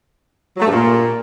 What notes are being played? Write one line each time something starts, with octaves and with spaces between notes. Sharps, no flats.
F#3
A3
G2
A#2